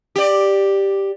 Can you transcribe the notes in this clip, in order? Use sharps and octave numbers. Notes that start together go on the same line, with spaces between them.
G4 D5